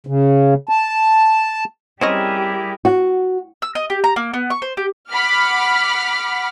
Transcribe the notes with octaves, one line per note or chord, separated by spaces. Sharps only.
C#3
A5
G3 C4 C#4 E4 G4 G#4 A#4 D#5
F#4
E6
D#5
G4
A#5
A#3
B3
C#6
C5
G4
F#5 B5 D6 F6